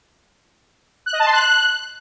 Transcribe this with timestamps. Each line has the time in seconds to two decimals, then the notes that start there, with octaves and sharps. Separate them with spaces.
1.06 F#6
1.13 D#5
1.20 A5
1.26 C6
1.33 F#6